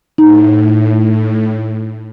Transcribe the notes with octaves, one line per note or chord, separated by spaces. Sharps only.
A2 D#4